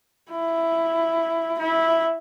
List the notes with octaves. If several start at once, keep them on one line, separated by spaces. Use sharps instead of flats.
E4
E4